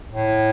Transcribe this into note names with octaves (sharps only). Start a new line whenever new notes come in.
A2